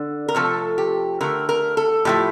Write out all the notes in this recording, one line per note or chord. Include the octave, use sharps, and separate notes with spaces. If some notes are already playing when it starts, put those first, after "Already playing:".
Already playing: D3
A#4
C3 F3 A3 A4
G4
D3 A3 A#4
A#4
A4
A2 F3 A3 G4